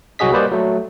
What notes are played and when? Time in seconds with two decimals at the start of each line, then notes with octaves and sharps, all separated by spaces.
0.19 C2 F#3 F#4 G#4 D#5 B6
0.32 G3 A#3 B4 C5 D5 D#5
0.52 F#3 A3